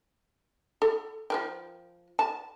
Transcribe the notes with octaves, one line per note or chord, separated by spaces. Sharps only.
A4
F3 A#4 G5
A5